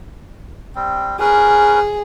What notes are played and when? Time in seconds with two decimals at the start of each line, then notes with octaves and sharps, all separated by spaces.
0.75 G3 C4
1.20 C#4 G#4 A#4 B4